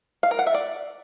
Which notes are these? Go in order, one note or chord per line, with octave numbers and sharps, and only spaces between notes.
F5
A#4
F#5
E5
D5